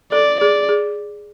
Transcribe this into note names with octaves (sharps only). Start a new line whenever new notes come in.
A4 D5
G#4 D5
G#4